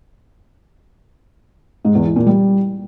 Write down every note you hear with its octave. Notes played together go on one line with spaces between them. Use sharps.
G#2
E2
E3
A#2
G3